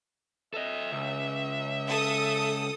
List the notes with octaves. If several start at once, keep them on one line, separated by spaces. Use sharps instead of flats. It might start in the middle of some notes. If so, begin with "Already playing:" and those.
A4 D#5 E5
C#2
A4 D#6